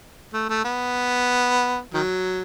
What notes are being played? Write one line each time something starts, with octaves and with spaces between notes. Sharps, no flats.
A3
A3
B3
D#3 F#3